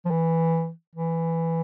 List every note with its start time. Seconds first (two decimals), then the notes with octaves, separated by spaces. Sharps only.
0.05 F3
0.11 E3
0.95 E3